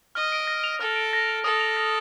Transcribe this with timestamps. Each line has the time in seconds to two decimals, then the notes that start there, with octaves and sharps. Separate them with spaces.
0.15 D#5 F6
0.32 D7
0.47 A#6
0.64 F7
0.80 A4 F6
0.96 D7
1.13 A#6
1.29 F7
1.44 A4 D#6
1.61 F7
1.77 A#6